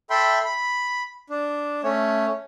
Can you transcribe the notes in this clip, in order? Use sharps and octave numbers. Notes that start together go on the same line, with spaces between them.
A4 E5 G5 B5 C6
B5
D4
A3 C#4 C#5